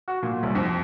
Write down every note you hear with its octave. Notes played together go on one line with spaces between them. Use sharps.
F#4
A#2
C2
F2